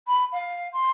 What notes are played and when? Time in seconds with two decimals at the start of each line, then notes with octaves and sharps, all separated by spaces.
0.07 B5
0.32 F5
0.72 C6